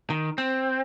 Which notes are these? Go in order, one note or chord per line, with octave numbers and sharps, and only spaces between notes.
D#3
C4